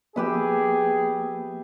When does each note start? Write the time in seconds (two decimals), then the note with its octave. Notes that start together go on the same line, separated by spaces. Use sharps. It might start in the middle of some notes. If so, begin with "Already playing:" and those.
0.16 F3 A#3 B3 G4 G#4 B4 E5